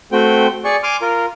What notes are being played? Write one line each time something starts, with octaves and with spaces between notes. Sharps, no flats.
A3 C4 F#4 G5
G#4 D5 C#6
G#5 C6 D6 F6
F4 A#4